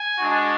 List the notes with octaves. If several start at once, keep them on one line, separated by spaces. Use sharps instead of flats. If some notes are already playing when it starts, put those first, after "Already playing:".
Already playing: G#5
G#3 D4 F#4